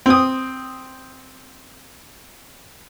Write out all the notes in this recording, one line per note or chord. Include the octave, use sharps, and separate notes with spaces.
C4 D#6